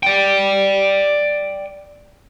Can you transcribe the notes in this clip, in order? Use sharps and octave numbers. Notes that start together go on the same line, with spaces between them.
D5 G5